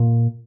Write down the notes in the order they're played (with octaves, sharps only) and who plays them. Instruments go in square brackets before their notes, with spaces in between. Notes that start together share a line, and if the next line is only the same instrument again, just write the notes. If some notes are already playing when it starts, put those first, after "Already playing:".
Already playing: [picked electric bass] A#2